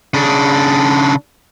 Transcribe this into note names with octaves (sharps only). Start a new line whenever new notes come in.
C#3 D4